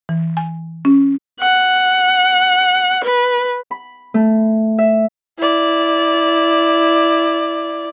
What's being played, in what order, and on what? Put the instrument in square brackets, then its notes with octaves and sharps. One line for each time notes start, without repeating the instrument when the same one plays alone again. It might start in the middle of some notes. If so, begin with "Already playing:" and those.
[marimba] E3
G#5
C#4
[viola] F#5
B4
[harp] B5
A3
E5
[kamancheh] E4 D5